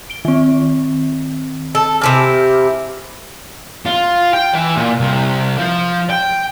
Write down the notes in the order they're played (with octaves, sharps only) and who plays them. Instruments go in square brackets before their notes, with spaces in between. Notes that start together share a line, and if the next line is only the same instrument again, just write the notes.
[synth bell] D7 G7
D#3 C4
[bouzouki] A4
[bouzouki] C3 E4 G4 [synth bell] G#5 F6
[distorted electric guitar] F4
G5
E3
A#2
C2
F3
G5